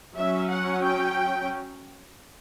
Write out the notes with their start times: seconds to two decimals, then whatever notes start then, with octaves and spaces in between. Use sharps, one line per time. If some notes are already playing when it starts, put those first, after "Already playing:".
0.16 F#3 C#4 E5
0.49 F#5
0.83 G5